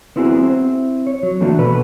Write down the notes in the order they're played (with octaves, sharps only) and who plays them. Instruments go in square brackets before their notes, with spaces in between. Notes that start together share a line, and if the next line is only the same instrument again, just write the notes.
[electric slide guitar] B3 C4 E4 F#4 G#4
C4 E4
C#5
F#3
D3 E3 A3 A#3 D4 F#4
B2 B3 A4 B4